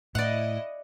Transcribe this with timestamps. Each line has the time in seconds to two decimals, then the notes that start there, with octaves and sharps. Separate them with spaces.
0.15 A2 E4 D5 D#5 F#5